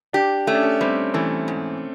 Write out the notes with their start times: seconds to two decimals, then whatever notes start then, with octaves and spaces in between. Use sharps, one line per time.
0.13 D4 G4
0.47 A3 C#4
0.55 D4
0.63 C#4
0.81 G3 C4
1.14 E3 A3
1.48 G#2